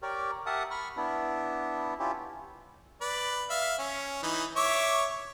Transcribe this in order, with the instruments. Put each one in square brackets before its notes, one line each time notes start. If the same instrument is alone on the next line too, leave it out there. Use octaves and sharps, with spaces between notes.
[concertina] G4 A#4 C#5 D5
G4 A#4 E5 F#5 A5 D#6
B5 C#6 F6
B3 D4 E4
C#4 E4 F4 G4
[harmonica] B4 D5
E5 F5
C#4
E3 D#4
C#5 E5 D6